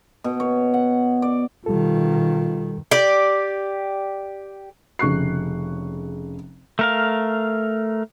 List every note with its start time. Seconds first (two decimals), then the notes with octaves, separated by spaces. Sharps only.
0.24 B2
0.40 C#5
0.74 F#5
1.22 D5
1.66 B2 D#3 G3 F4 A4
2.91 G4 D5
4.99 F1 C#3 C#6 F#6 C7
6.79 A3 A#4 F5